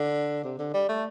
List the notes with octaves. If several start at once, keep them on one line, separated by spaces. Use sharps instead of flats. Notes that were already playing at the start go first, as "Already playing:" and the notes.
Already playing: D3
C3
D3
G3
A3